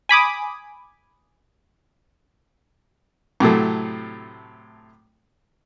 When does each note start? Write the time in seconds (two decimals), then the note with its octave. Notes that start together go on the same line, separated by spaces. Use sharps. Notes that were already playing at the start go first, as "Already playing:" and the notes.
0.09 G#5 B5 D6 D#6
3.40 A2 C3 F#3 A3